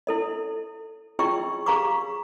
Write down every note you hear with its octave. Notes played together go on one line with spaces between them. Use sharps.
E4 A4 D#5
E4 F4 G#4 D#5 G5 C#6
G4 G#4 F5 A#5 C#6 D6